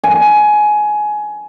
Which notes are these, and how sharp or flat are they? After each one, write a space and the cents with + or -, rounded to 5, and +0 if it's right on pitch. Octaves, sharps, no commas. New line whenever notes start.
G#5 +20